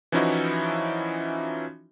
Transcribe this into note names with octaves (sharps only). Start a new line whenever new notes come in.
E3 F3 C#4 D#4 E4 F#4